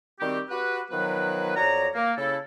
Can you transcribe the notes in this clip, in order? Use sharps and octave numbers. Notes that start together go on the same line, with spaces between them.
D#3 G3 C4 F#4 G4
F#4 G4 B4
D#3 F3 F#3 B3 B4
F2 F#3 C#5 D5 A#5
A#3
C#3 E4 A4